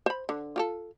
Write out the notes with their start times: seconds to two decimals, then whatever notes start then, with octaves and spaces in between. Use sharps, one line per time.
0.06 C5 B5
0.29 D3
0.56 F4 G4 A4